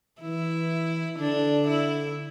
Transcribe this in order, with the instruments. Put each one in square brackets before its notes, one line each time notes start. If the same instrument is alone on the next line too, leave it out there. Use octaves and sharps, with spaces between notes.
[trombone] E3 [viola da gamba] E4
[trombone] D3 [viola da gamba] D4
[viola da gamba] E4